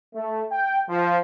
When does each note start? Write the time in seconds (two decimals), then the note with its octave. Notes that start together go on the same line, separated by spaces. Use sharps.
0.14 A3
0.51 G5
0.88 F3